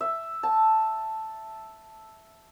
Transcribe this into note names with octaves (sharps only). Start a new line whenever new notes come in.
E5
A5